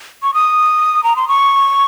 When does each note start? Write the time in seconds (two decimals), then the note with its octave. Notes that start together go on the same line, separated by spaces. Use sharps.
0.23 C#6
0.34 D#6
1.04 A#5
1.16 C6
1.28 C#6